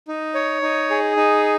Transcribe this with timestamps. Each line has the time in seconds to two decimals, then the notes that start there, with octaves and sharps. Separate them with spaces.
0.08 D#4
0.35 C#5
0.62 D#4
0.90 G#4
1.17 D#4